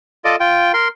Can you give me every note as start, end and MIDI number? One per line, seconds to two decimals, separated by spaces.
0.25 0.36 65
0.25 0.36 69
0.25 0.36 74
0.25 0.36 75
0.40 0.72 65
0.40 0.72 79
0.74 0.88 70
0.74 0.88 84